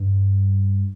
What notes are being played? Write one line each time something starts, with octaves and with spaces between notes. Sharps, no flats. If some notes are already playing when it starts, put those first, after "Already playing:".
Already playing: G2